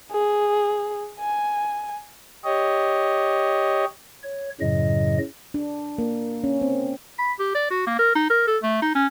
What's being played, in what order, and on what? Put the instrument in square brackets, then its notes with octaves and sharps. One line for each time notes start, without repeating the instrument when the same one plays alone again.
[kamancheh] G#4
G#5
[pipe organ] G4 C#5 D#5
C#5
F#2 A2 C#3 F#3 D#5
[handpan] D4
A#3
C#4
C4
[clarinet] B5
G4
D5
F#4
A#3
A#4
D#4
A#4
A4
A3
D#4
C#4